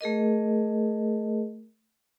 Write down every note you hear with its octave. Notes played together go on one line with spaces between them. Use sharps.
A3 G#4 A#4 D#5